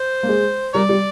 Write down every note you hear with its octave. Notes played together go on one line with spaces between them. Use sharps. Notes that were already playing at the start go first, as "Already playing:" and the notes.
Already playing: C5
A#3
G#3
G3 A#4 D5
G3